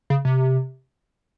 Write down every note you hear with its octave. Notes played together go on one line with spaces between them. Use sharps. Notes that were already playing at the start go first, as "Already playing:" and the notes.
C#3
C3